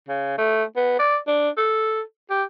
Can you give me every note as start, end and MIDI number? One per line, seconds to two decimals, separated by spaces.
0.09 0.37 49
0.38 0.64 57
0.76 0.94 59
0.99 1.17 74
1.27 1.50 62
1.57 2.01 69
2.30 2.43 67